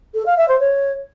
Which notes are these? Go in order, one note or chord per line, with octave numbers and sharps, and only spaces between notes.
A4
F5
E5
C5
C#5